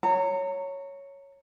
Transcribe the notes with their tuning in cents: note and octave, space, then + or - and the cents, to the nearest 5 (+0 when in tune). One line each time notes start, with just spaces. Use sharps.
C#5 +0 A#5 -30